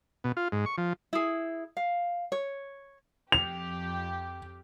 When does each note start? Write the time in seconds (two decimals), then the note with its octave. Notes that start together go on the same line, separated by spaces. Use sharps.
0.24 B2
0.37 F4
0.52 G#2
0.66 C#6
0.78 F3
1.13 E4 G#4
1.77 F5
2.32 C#5
3.32 F2 G4 F7